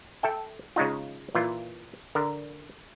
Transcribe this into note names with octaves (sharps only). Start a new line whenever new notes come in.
A4 E5 G5
C#3 G#3 D#4 F4
A#2 E3 F4
D3 A#4